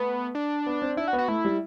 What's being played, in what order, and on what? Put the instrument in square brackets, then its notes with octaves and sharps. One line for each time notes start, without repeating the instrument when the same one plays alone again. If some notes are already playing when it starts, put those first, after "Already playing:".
Already playing: [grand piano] A3 [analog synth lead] B3
[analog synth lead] D4
[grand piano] B3
C4
[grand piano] D4 [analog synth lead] E4
[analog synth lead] F#4
[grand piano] B3
[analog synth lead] F#4
[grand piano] A3 [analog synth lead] E4
[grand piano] G3